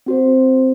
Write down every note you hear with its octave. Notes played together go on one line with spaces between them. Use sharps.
C4 F#4 C5